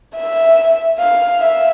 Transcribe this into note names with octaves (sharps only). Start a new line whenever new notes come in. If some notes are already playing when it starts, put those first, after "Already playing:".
E5
F5
E5